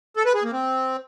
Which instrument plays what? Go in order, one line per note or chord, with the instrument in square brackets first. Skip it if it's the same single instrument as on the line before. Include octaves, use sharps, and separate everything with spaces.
[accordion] A4
B4
G#4
A#3
C4